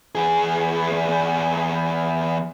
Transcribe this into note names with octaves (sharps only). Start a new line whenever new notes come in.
E2 G#4